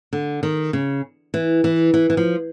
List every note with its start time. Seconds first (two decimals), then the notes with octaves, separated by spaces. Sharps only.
0.13 D3
0.43 D#3
0.73 C#3
1.34 E3
1.64 E3
1.94 E3
2.10 E3
2.17 F3